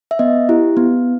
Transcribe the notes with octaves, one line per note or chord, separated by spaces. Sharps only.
E5
B3 D#5
E4 G4
B3